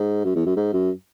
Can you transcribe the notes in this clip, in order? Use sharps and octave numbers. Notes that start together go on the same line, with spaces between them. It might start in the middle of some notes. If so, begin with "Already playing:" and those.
Already playing: G#2
F#2
E2
F#2
G#2
F#2